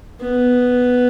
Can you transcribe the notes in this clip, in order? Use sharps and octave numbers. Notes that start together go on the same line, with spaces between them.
B3